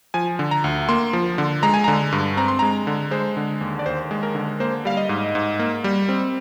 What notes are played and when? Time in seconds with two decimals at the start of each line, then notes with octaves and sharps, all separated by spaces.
0.14 F3 G#5
0.39 D3
0.51 A#5
0.64 D2
0.89 A#3 C6
1.13 F3
1.38 D3
1.63 G#3 A#5
1.74 G#5
1.84 A#5
1.88 D3
2.12 G2
2.37 C4 A#5
2.48 C6
2.59 G#3 A#5
2.87 D3
3.11 G#3 C5
3.37 D3
3.61 D#2
3.79 D5
3.86 D#2 C5
4.11 G#3
4.23 A#4
4.35 D3
4.60 A#3 C5
4.85 G3 F5
4.97 D#5
5.09 G#2
5.35 G#2
5.59 A#3
5.84 G3
6.09 C4